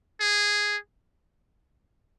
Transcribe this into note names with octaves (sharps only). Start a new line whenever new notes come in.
G#4